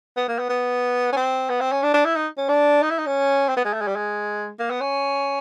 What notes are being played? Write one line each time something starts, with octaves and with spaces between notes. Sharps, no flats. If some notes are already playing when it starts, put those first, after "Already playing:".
B3
A#3
B3
B3
C#4
C4
B3
C4
C#4
D4
D4
E4
D#4
C#4
D4
D#4
E4
D#4
C#4
C4
B3
G#3
A3
G#3
G3
G#3
A#3
B3
C#4